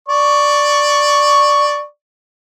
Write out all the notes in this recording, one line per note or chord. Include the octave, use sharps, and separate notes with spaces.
D5 C#6